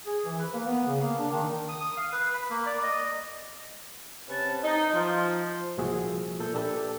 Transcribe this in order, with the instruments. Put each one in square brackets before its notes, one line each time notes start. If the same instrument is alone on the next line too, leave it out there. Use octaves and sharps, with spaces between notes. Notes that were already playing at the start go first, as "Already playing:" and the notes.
[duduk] G#4
E3
B4
A#3
B3
C#3
A#3
D4
D#3
[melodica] D#6
D#6
F5
B4
B5
A#3
D5
D#5
[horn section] C3 C#4 B4 A5
D#4
F3
[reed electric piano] C2 A#2 F3 F#4 G#4 E5
A#2 A4 G6
D4 G4 A4 B4 D5 E5